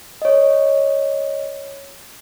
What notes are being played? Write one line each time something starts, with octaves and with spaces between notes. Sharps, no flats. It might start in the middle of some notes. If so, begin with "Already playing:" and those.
C#5 D#5